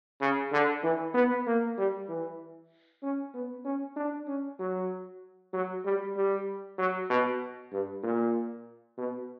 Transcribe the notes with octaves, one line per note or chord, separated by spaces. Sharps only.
C#3
D3
E3
B3
A#3
G3
E3
C#4
B3
C#4
D4
C#4
F#3
F#3
G3
G3
F#3
B2
G2
A#2
B2